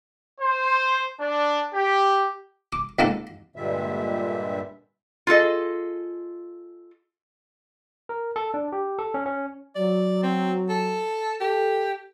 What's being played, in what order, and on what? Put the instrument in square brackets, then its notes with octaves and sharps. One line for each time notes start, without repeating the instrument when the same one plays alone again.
[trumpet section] C5
D4
G4
[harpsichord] D6
C#2 A#3 C4 D#4 A4 F#5
[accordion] G2 A#2 D3 G3 G#3 E5
[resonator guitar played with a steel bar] F4 G#4 A4 D#5
[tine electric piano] A#4
A4
D4
G4
A4
C#4
C#4
[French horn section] F#3 [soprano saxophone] D5
[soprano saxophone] C4
A4
[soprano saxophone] G4 [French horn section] A4